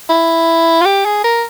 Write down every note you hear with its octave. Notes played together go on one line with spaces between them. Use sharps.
E4
F4
G4
G#4
A#4